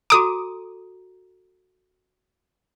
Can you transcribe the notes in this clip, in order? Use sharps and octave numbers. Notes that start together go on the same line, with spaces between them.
F#4 A4 A#5 D6 D#6